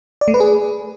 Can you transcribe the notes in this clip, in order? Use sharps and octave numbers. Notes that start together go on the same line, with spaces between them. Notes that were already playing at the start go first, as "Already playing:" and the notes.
D5
A3
B4
G#4